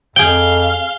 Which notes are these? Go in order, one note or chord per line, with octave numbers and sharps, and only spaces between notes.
F2 G#4 F5 G5 G7